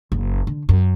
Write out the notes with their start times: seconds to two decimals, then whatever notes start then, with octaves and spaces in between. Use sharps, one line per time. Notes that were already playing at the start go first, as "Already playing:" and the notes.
0.12 F#1
0.47 D3
0.69 F#2